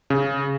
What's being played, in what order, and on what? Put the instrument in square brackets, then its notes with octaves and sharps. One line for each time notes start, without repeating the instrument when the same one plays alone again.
[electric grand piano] C#3